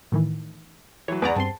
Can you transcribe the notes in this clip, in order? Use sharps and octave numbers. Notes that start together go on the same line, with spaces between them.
A2 D#3 E3
E3 F#3 C#5
E2 B4 D5 F#5 A#5
G2 C4 A5 C6